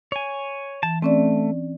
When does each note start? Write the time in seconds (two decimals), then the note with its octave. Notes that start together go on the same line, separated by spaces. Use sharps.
0.12 C#5 G#5
0.83 E3 A5
1.02 A3 C4 C#4 D5